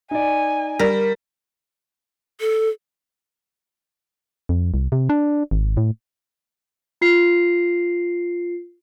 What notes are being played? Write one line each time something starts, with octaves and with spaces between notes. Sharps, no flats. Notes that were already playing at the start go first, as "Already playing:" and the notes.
D#4 D5 G#5
G3 A#4
A4
F2
C2
C3
D4
G#1
A2
F4 C7